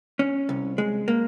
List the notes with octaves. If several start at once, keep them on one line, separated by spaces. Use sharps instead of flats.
C#4
C2
G#3
A#3